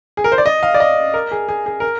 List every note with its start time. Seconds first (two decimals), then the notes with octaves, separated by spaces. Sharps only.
0.17 G#4
0.24 A#4
0.32 C5
0.38 D5
0.46 D#5
0.63 F5
0.74 D5
0.80 D#5
1.14 A#4
1.32 G#4
1.49 G#4
1.66 G#4
1.80 A#4